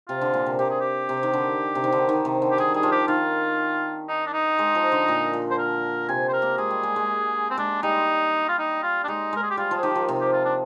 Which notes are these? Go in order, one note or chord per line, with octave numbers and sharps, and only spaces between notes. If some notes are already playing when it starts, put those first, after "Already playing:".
C3 F4
D3
A#2
C3
C3 G4
G#4
G4
C3
D#3
D3
C3
D#3
D3
D#3
C3
D3
G4
D#3 G#4
G3 G#4
F3
G4
D#3 F4
D#4
D4
D#4
G#3
F3
D3
A#2
A#2
C5
A#4
C3 G#5
C5
A#4
A#3
G#3 G#4
G3
G#3
G#3
C4
G#3 D4
G3 D#4
F4
D#4
F4
D4
G#3 D#4
G#3 A#4
G#4
G4
G3 F4
F3
G#4
D#3 G4
F3
C3
G4
F4
D4